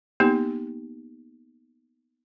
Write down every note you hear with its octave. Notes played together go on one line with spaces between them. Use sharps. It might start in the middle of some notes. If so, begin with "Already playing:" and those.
A#3 B3 D#4 G4